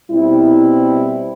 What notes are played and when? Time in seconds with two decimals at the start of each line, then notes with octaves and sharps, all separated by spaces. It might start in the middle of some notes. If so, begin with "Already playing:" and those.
0.10 B2 G3 C4 E4